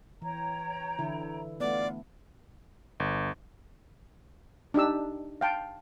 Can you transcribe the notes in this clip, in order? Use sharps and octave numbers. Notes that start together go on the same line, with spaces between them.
E3 C#5 G5 A#5
D3 E3 E4
A3 B3 F4 D5 F#5
G1
D4 D#4 G4 E6
F5 G5 A5